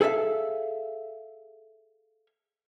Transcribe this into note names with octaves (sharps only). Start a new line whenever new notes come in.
G#4 A4 D5 E5 F5